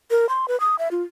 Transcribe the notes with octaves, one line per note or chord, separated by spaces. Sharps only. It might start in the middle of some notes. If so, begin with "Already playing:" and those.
A#4
C6
B4
D#6
E5
F4